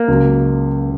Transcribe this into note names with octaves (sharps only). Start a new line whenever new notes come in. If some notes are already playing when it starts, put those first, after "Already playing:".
Already playing: A#3
C#2 C#3 F#3